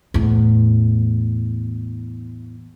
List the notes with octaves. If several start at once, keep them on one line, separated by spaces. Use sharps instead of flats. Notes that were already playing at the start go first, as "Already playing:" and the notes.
E2 A2